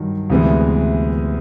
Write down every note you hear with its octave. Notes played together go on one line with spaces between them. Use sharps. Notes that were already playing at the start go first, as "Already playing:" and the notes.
Already playing: G2 D#3 F#3
D2 C3 E3 G#3 B3